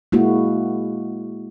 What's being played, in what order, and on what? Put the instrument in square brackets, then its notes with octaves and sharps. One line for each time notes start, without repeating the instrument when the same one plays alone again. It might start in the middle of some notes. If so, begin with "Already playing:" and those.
[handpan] G#3 A#3 E4 F#4